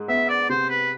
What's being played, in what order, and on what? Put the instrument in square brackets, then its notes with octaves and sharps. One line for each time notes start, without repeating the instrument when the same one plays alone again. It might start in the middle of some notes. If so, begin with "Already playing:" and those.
Already playing: [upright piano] G#2 G#3
[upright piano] B3 [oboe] E5
[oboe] D5
[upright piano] C3 [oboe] C5
[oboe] B4